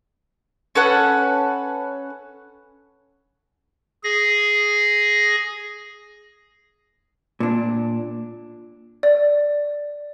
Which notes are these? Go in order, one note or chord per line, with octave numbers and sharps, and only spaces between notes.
C#4 A4 B4 F#5
G#4 A#6
A#2 D4
D5